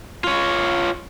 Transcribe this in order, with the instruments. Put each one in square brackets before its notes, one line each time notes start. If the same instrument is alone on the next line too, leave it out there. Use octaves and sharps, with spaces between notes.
[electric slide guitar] F4 C#5